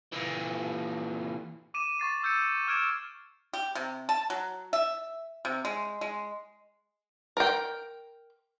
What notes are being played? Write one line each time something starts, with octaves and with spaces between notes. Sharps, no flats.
A#2 E3
D6 D#7 E7
C#6 A6 C7
E6 G6 A6 C#7
D6 F6 G#6 D7 E7
G4
C3
A5
F#3
E5
C3
G#3
G#3
A#4 G5